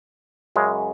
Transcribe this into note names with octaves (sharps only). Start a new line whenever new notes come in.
F#2 C#3 G#3